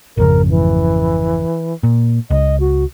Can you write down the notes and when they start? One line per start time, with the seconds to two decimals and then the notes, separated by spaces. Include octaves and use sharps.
0.17 G#1 F2 C#3 A#4
0.49 E3
1.83 A#2
2.31 C#2 D#5
2.60 F#4